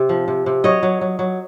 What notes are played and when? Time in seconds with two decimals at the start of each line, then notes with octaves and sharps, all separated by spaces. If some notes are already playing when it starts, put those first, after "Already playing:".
Already playing: C3
0.09 F3
0.28 C3
0.46 C3
0.64 F#3 C#5 D#5
0.83 F#3
1.01 F#3
1.19 F#3